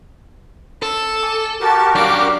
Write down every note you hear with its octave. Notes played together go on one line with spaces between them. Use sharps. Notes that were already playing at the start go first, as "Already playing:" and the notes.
A4 E6
G#5 D6
F#4 G4 A#4 A5
F#2 D4 D5 F5 D6